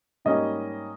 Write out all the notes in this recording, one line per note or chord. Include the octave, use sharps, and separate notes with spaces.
G#2 G3 A#3 C#4 D#5